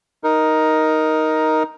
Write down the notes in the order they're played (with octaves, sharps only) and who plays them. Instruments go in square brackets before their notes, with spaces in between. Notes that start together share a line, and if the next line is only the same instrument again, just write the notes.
[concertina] D#4 A#4